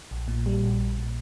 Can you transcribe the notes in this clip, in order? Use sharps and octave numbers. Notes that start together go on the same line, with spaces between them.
A#1
A#2
G3
A#1
A#1
A#2